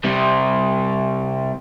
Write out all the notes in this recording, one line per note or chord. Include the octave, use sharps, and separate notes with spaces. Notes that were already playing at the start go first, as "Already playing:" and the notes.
C3 G3